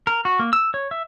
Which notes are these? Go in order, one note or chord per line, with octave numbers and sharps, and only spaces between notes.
A#4
F#4
A#3
E6
C#5
E5